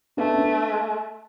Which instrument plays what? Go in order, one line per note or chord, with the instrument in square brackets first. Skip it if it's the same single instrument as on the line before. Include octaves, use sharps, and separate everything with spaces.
[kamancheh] A3 [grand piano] B3 D4
[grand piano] C#4
B3 D4